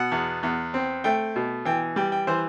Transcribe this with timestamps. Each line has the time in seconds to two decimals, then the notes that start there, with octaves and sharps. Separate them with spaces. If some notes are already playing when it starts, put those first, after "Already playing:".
Already playing: B2 F#5
0.12 E2
0.43 E2
0.74 C4
1.04 A3 G5
1.36 B2
1.65 E3 G5
1.96 G3 G5
2.12 G5
2.27 E3 C5